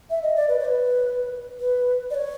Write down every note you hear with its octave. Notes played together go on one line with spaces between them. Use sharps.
E5
D#5
D5
B4
C#5
B4
B4
D5
C#5